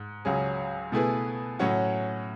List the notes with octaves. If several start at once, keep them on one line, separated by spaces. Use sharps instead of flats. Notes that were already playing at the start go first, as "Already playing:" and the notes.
Already playing: G#2
C#2 C#3 F#3 C#4 G#4
B2 A3 E4 G#4 B4
A2 F#3 C#4 F#4